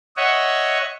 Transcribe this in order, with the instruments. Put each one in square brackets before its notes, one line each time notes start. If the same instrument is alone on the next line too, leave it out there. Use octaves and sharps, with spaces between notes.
[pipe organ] C#5 D#5 E5 F#5 C#6